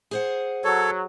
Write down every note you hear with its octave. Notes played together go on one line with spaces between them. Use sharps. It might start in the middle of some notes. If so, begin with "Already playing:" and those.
G#4 C5 F#5
F#3 A4 C#5